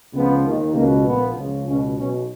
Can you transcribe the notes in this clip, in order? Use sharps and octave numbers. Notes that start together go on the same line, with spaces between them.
C#2 C#3 F3 B3
D#2 D#3
C#2 B2 A#3
A#1 A#2 F3 B3
C#2 C#3 F3
C#2 B2 C#4
B1 B2 C#4